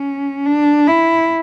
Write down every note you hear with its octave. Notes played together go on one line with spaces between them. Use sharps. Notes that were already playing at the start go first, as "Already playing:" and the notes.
Already playing: C#4
D4
E4